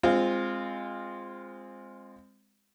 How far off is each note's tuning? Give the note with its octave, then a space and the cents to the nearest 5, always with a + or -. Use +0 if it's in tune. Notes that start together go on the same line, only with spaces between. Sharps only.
G#3 -20 C4 +0 F4 +0